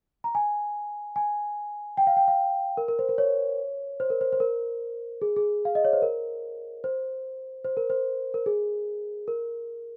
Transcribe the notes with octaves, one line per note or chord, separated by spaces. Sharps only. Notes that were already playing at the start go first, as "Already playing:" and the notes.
A#5
G#5
G#5
G5
F5
G5
F5
A#4
A#4
C5
A#4
C#5
C5
A#4
C5
C5
A#4
G#4
G#4
F5
D#5
C#5
C5
A#4
C5
C5
A#4
C5
A#4
G#4
A#4